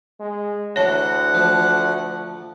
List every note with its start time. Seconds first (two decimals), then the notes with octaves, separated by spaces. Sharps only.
0.20 G#3
0.76 D2 E4 F#4 C#5 F#5 A5
1.34 F3 A3